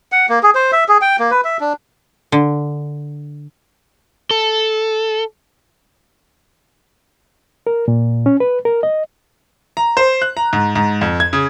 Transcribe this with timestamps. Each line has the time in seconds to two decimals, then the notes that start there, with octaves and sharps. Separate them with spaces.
0.12 F#5
0.29 A#3
0.43 G#4
0.55 C5
0.72 E5
0.88 G#4
1.01 G5
1.19 A#3
1.31 B4
1.45 E5
1.60 D4
2.32 D3
4.31 A4
7.67 A#4
7.88 A#2
8.26 C#4
8.40 B4
8.65 A#4
8.83 D#5
9.77 A#5
9.97 C5
10.22 F#6
10.37 A#5
10.53 G#2
10.75 G#2
11.01 F2
11.20 G#6
11.33 C#3